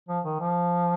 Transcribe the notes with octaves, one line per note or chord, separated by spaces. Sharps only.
F3
D#3
F3